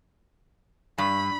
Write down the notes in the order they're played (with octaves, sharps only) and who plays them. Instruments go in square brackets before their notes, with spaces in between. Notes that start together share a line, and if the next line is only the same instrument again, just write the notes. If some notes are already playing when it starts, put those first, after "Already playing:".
[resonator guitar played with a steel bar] G2 [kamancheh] B5